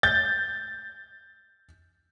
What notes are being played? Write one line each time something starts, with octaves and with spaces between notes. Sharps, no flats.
G6 A6